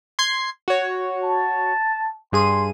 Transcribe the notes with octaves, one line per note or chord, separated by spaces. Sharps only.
C6 G#6 C7
F#4 C#5
A5
G2 G#4 C6 D#7